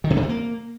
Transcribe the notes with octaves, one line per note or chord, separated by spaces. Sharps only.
D#3
B2
C3
A3
A#3